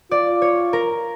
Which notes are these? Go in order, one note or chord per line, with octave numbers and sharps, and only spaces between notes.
F4 D5
C#5
A#4